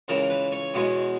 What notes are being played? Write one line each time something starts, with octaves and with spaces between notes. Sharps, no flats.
C#2 C#3 E3 A#4
B4
C#5
E2 B2 G#3